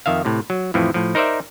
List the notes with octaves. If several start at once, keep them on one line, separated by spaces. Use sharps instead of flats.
F2 D#3 E5 F5
A2 C3
F#3
F2 A2 E3 F3
A2 F3
D#4 A#4 C5 D5 E5